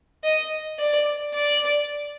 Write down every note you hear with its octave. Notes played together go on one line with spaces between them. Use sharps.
D#5
D5
D5